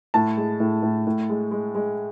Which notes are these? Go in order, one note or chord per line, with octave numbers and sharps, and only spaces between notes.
A2 A5
G#3
A2
A2
A2
G#3
G#3
G#3